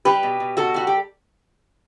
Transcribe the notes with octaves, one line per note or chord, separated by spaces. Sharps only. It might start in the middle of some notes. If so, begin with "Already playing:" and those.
G3 G4 B4
B2
B2
B2 F#4 A4
G3 F#4
G4